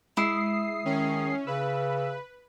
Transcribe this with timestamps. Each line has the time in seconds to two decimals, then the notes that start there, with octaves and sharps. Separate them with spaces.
0.17 G#3 E4 D#6 C7
0.85 D#3 C#4
1.47 C#3 B4 E6